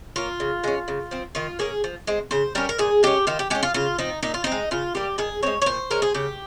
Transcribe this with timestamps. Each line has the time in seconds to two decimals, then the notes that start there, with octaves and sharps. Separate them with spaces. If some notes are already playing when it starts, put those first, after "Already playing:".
0.16 A#3 C#4 F4
0.40 C#3
0.64 G#3 C#4
0.88 C#3
1.11 F3 C4
1.35 D#3 F4
1.59 A#3 C#4 G#4
1.84 F3
2.07 G#3 C4
2.31 C#3 C5
2.55 G3 C#4 A#4
2.69 A#4
2.78 A#2 G#4
3.03 G#3 C#4 G4
3.27 D#3 F4
3.39 G4
3.50 G#3 C#4 G4
3.63 F4
3.74 C#3 F4
3.98 F3 C4 D#4
4.23 A#2 D#4
4.34 F4
4.44 C4 D#4
4.52 G#3
4.71 C#3 F4
4.95 G3 A#3 G4
5.18 D#3 G#4
5.43 G#3 C4 C#5
5.62 C#5
5.66 A#2 C5
5.90 G#3 C#4 A#4
6.02 G#4
6.15 C#3 G4